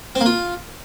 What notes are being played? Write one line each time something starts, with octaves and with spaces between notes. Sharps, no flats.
C4
A#3
F4